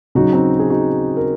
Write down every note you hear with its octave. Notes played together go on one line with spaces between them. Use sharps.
C#3 F#3 D#4 F#4
C4 D#4
G#4
D#4 F#4
A#4